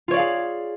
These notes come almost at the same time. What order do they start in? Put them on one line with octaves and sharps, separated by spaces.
F4 C#5 D5 F5 G#4